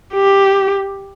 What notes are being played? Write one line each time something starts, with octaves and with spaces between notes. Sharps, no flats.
G4